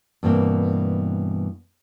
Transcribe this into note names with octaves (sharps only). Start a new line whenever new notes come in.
G2 B2 E3 A#3 C4